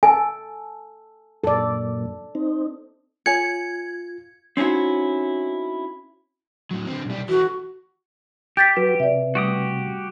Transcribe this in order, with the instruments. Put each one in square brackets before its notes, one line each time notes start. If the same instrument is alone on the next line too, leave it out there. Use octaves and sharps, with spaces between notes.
[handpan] A4 [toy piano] G#5
[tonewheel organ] F#2 A#2 [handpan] A4 D5
[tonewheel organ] C4 D#4
[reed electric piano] F4 [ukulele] C#5 G#5 [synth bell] G#6 [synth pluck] C#7
[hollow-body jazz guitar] C4 C#4 D#4 E4 F#4
[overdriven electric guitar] A2 F#3
D3 C4
B1 G3
[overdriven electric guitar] E3 A3 [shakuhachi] F#4
[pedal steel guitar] G4 [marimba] G5 [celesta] G6 A6 B6
[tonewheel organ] F#3 F#4 [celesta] B4
[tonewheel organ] C3 [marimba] D5 E5
[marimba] G3 A3 [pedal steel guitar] F#4 G4 D#6